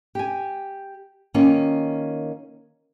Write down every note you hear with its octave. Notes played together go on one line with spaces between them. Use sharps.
G4 G#5
D#3 A#3 C#4 F4